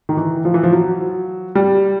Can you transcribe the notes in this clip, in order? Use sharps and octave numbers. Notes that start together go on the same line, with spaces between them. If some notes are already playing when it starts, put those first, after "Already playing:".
D#3
E3
F3
E3
F3
F#3
G3